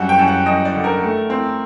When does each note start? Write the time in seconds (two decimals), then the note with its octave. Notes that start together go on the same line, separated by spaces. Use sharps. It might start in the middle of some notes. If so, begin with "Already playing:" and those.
Already playing: F#2 G3 F#5
0.09 G5
0.19 F#2
0.28 F#5
0.46 F#2 D#5
0.65 D5
0.74 D3
0.84 A#4
1.02 A3
1.30 C4